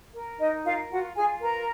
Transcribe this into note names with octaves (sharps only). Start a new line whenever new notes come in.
A#4
D#4 D#5
F4 A#4 F5
F4 F#4 F#5
F4 G#4 G#5
A#4 B4 A#5